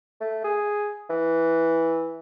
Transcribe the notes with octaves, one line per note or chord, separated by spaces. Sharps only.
A3
G#4
E3